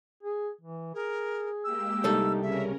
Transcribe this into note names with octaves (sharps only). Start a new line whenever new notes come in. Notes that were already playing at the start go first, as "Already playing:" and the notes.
G#4
E3
G#4 A#4
G#3 A#3 G4 E6
C2 G3 D#4 A4
C#3 C#4 A#4 E5